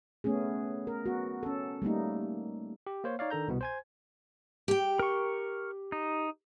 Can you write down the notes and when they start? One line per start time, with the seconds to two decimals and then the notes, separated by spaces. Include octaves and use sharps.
0.24 A3 B3 C#4 G#4
0.87 A#4
1.06 B3 F#4
1.43 C#4 A4
1.82 G3 A3 A#3 D#4
2.87 G4
3.04 A#3 C5 C#5
3.19 D#4 C#5 D5 F5
3.31 D#3 D4 A4 A#5 G6
3.48 C2 B2 B3
3.61 C5 G#5 G#6
4.68 G4 G5
4.99 A#4 C#6
5.92 D#4